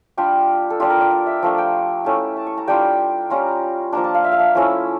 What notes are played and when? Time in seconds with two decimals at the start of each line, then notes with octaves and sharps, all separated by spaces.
0.17 G3 D4 F4 G4
0.70 A4
0.80 G3 D4 F4 G4
0.90 A#4
1.01 D5
1.11 D5
1.27 E5
1.43 F3 A3 D4 F5
1.58 G5
2.05 A3 C#4 E4
2.37 A5
2.47 C#6
2.58 A#5
2.68 G3 D4 F4 G5
3.30 G3 C#4 F4 A#5
3.92 F3 A#3 D4 A#5
4.04 A5
4.14 F5
4.24 E5
4.32 F5
4.39 E5
4.55 F3 A3 C#4 E4